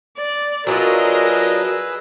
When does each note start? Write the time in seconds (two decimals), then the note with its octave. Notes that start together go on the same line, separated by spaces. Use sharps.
0.17 D5
0.67 F#3 D4 F4 G#4 A#4 B4 D#5 E6